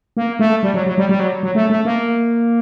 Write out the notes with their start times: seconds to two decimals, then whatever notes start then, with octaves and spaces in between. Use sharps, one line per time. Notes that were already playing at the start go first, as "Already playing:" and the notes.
0.17 A#3
0.39 A3
0.63 G3
0.74 F#3
0.86 F#3
0.98 G3
1.09 G3
1.20 F#3
1.43 F#3
1.55 A3
1.70 A3
1.85 A#3